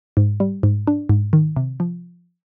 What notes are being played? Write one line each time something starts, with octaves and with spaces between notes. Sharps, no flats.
G#2
G3
G#2
D4
G#2
D#3
C3
F3